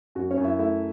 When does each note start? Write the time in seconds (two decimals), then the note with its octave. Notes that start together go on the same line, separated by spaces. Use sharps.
0.15 F#2 F#4
0.31 C#4 C#5
0.38 F#2
0.44 E4 E5
0.59 A3 E4 E5